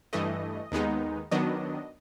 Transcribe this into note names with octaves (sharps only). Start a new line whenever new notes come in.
G2 E3 A3 D#5
D#2 D#3 G#3 B3 D#4
D#3 F#3 B3 D4 D#5